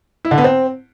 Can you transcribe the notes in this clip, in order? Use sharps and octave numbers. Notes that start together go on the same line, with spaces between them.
E4
D3
B3
C4